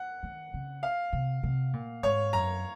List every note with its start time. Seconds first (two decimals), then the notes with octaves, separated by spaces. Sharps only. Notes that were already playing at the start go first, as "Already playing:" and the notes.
Already playing: F#5
0.23 D#3
0.54 C#3
0.83 F5
1.13 C3
1.43 C3
1.73 A#2
2.03 G#2 C#5
2.33 F#2 A#5